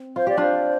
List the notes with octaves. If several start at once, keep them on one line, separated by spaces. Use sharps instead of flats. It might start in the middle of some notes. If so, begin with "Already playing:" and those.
Already playing: C4
F4 C5
G4 D5
D4 F4 C5